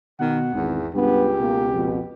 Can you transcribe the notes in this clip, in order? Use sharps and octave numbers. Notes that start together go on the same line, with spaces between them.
B2 D#3 F#5
G#1 E2
C#2 G2 B3 G4
B2 A#3
F2 B2